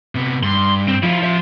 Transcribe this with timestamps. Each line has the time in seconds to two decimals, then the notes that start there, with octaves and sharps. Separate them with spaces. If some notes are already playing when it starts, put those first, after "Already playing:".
0.15 C3 B3
0.43 G2 C6
0.88 C4
1.03 F3 E4 F5
1.24 E5 C6